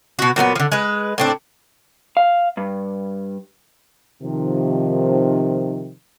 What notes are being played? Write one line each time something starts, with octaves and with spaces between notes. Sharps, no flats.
B2 F#4
A#2 F#3 A#3 B3
D3 F3
G#3 B4
A2 C4 D4
F5
G2
C3 D#3 F3